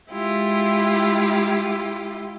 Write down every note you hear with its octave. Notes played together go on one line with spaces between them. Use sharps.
G#3 E4 F4 G4